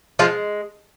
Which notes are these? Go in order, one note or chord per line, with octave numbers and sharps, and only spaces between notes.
F3 G#3 F4